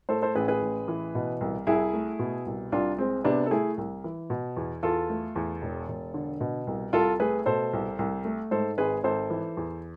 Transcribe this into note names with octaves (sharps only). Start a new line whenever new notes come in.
A2 A4 C5
A4 C5
A1 G#4 B4
G#4 B4
A1
E3
B2
C2
C2 E4 G#4
A3
B2
C2
C2 D4 F4
G#3 C4
C3 B3 D4
A4
A3 E4 G#4
C2
E3
B2
E2
E2 F4 A4
A3
E2
E1
E1
D3
B2
C2
C2 F4 A4
A3 G#4 B4
B2 A4 C5
C2
C2
A3
G#2 A4 C5
G#1 G#4 B4
G#1 A4 C5
E3
E2